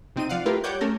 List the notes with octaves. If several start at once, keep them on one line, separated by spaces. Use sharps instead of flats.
C3 C4 D#4 D#7
F3 D5 F5 F#5
A3 E4 F4 G4 A#4 B4
G3 C#5 F#5 D6 G6
A3 C#4 A4 A#4